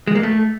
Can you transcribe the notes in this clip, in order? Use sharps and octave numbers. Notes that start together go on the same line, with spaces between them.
G#3
A#3
A3